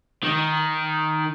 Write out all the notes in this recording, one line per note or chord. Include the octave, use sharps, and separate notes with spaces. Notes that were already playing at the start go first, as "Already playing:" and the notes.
D#3